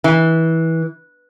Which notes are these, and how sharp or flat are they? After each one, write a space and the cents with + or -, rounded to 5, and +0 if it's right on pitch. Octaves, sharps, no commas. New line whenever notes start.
E3 -20